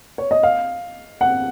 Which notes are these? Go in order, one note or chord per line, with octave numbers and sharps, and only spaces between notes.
C#5
D#5
F5
F#5